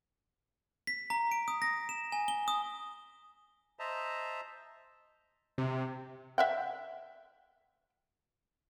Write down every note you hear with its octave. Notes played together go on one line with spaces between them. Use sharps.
B6
A#5
D7
D#6
A#6
E7
G#5
G7
D#6
C5 D#5 E5 A5 A#5
C3
E5 F#5 G5